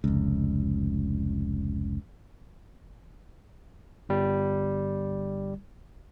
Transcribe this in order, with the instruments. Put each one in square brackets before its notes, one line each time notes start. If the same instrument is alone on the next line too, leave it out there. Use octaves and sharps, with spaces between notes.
[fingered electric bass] F1 C#2
[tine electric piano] G1 G3